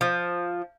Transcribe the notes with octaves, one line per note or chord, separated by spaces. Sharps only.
F3